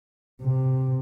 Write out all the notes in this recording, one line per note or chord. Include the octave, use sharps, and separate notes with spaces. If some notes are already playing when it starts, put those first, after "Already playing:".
C3